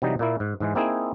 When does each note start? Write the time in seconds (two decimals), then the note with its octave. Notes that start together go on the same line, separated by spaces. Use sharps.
0.02 C3 E3 F#3 G3 D#4
0.19 A#2 A#3 E4
0.40 G#2
0.60 G#2 E3 G#3
0.75 A#3 C4 D#4 E4 G#4